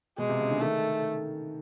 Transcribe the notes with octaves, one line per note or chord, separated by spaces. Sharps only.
B2 G#3
C3
C#3
D3
D#3 A3